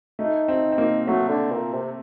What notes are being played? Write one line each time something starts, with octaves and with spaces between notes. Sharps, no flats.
A3 D#4
C4
C4
A#3
F#3 A3
D3
A#2
C3